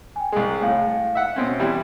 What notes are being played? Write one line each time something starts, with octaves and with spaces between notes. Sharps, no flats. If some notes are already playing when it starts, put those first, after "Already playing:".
G5 G#5
C2 G#3
A2 F5
E5 F#5
B2 C4 C#4
E3 G3 G5